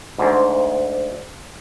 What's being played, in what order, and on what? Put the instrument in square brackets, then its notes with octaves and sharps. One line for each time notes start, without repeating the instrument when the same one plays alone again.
[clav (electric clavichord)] D2 G#2